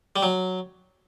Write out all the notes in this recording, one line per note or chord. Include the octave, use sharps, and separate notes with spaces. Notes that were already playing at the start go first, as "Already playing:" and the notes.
G3
F#3